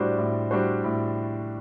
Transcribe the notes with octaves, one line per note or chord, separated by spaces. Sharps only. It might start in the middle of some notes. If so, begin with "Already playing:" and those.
Already playing: A2 G3 D4 F#4 C5
A2
G3 D4 F#4 C5
A2